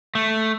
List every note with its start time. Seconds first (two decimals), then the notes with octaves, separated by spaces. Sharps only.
0.15 A3